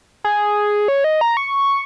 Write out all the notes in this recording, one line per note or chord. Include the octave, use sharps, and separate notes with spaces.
G#4
C#5
D#5
A#5
C#6